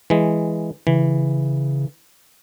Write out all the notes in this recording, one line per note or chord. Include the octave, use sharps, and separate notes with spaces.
E3 G#3
C#3 E3